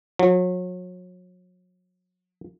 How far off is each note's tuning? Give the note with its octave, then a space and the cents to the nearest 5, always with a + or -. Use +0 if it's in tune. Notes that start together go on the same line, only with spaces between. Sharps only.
F#3 -35